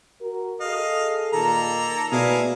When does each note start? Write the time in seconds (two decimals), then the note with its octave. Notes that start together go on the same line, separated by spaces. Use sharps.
0.21 F#4 A#4
0.60 G#4 A4 D#5 F5
1.33 A#2 D#3 A#3 A4 A#5
2.12 B2 A3 A#3 E4 G#4 D5 F5